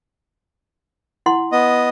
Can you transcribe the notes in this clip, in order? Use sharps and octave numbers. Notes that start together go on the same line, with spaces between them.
E4 F#5 C6
B3 D#5